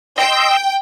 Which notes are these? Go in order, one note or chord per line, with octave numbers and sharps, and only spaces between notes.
D#5 G5 C6 E6